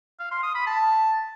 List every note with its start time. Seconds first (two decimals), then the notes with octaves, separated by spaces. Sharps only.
0.19 F5
0.31 C6
0.43 D#6
0.55 B5
0.67 A5